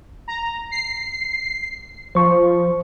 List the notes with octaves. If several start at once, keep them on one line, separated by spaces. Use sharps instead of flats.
A#5
C7
F3 C5 C#6